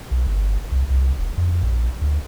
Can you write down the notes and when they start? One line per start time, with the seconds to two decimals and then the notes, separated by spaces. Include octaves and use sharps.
0.11 B1
0.27 G1
0.72 C2
0.90 C2
1.19 E1
1.37 F2
1.63 A#1
2.01 D2